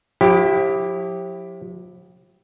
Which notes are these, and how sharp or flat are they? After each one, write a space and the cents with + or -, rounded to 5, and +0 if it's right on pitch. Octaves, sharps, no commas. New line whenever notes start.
F3 +45 E4 +0 G4 +5